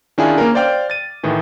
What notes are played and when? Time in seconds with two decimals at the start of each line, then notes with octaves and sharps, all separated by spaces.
0.18 D#3 C#4 D4 E4 F4 G#4
0.38 A#3 C#4 A#4
0.55 C5 D5 F5 G5 D6 F6
0.90 A6 D#7
1.23 A2 D#3 E3